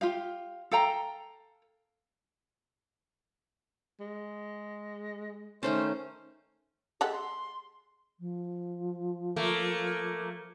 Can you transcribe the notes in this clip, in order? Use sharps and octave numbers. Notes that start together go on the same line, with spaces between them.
F4 G4 F5
A4 F5 G5 A#5
G#3
D#3 A3 C#4 C5
G#3 G4 A4 F#5
C6
F3
A3 A#3